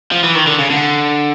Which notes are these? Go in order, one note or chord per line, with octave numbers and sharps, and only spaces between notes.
F3
E3
D#3
D3
C#3
D3